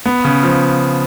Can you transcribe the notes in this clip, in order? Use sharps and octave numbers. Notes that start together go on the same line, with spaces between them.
B3
C#3
F3